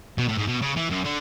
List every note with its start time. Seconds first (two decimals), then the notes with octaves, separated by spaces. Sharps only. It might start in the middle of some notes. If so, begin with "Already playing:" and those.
0.18 B2
0.29 A2
0.38 G#2
0.48 B2
0.62 C#3
0.76 E3
0.90 F#2
1.05 D3